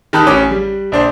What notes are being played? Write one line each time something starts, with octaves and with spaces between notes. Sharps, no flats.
D#3 G4 A5 B5 D#6 F#6
A1 C#4 D6
G3
A#1 D4 C5